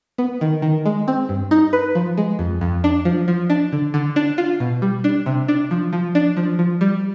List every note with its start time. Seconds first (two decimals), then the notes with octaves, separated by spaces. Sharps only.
0.18 B3
0.41 D#3
0.62 D#3
0.86 G#3
1.08 C4
1.29 G2
1.51 D#4
1.73 B4
1.95 F3
2.18 G#3
2.39 F2
2.61 F2
2.84 D4
3.05 F3
3.28 F3
3.50 D4
3.73 D3
3.94 D3
4.16 D4
4.38 F4
4.60 B2
4.82 G3
5.04 D4
5.26 C3
5.48 D4
5.71 F3
5.93 F3
6.15 D4
6.37 F3
6.59 F3
6.81 G3